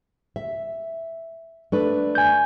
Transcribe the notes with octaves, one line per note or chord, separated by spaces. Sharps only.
E5
A3 D4 B4
G#5 G6